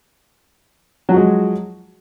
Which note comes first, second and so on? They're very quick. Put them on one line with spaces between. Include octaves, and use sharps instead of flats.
F#3 F3 F#4 G#3